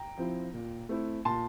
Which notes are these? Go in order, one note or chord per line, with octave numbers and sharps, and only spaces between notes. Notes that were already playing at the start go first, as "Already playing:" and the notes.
Already playing: G5 A#5
F3 C4 E4
A#2
A3 C4 E4
A#2 A5 C6